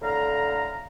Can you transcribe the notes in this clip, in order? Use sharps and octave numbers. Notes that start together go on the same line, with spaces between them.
A2 D3 F5 A#5